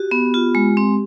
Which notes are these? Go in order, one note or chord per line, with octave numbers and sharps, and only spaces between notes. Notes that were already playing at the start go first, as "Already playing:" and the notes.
Already playing: F#4 G4
B3
F4
G#3
C4